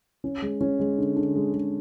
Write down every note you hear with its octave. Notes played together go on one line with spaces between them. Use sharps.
C#4
G#3
C#4
G#3
D3
D3
G#3
G#3